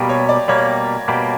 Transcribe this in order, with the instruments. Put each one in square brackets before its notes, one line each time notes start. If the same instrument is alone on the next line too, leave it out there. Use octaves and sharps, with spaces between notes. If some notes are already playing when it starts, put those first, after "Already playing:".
Already playing: [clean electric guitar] B2 G3 A#3 [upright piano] G4
[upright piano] C#5
D5
[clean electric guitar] B2 G3 A#3 [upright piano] C#5
[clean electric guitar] B2 G3 A#3